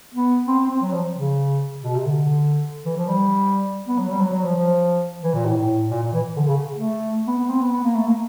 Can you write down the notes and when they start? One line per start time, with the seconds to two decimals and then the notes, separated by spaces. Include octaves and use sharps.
0.14 B3
0.48 C4
0.59 C4
0.70 C4
0.82 F#3
0.93 F3
1.16 C#3
1.84 B2
1.95 C3
2.06 D3
2.85 E3
2.96 F3
3.08 G3
3.88 B3
3.98 F#3
4.10 G3
4.21 F#3
4.33 F#3
4.44 F3
4.55 F3
5.23 E3
5.34 A#2
5.45 A2
5.57 A2
5.91 A#2
6.03 A#2
6.13 E3
6.36 D3
6.48 C#3
6.76 A3
7.27 B3
7.38 B3
7.50 C4
7.61 B3
7.72 B3
7.84 A#3
7.95 A3
8.06 A#3